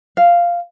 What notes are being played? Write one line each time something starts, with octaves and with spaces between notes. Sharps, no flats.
F5